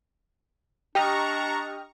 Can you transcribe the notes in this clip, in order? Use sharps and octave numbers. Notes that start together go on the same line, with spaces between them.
D4 G4 D#5 G5 A#5 C#6 F6